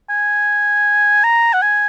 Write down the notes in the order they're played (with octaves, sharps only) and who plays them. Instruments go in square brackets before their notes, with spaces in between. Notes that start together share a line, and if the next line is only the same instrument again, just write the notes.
[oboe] G#5
A#5
F#5
G#5